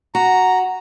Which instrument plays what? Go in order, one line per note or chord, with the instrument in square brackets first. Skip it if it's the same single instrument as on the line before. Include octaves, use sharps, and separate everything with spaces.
[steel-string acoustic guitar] F#4 [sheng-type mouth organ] A#5